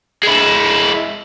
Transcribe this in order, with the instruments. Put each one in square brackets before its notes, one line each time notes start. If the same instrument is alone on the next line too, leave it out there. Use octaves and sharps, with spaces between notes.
[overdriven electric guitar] G#3 E4